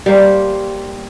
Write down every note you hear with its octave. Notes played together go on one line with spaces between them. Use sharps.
G3 A#3 C5